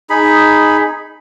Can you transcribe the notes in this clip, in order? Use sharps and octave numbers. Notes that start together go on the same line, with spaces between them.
D#4 G#4 B5